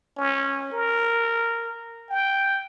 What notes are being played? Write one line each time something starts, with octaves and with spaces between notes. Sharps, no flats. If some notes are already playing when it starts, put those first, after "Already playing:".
C#4
A#4
G5